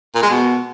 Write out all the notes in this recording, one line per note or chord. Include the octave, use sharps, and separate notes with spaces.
A#2
G#3
B2